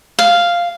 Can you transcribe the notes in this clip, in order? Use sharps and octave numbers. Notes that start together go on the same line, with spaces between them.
F5